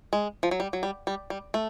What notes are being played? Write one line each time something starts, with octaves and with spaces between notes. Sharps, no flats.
G#3
F3
F#3
G3
F#3
G3
G3
G3
A3